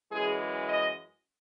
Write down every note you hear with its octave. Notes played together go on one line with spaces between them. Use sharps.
F#2 E3 G#3 G#4
D#5